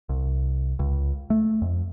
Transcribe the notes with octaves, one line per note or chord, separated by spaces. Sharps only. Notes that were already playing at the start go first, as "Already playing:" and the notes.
C2
C#2
A3
F2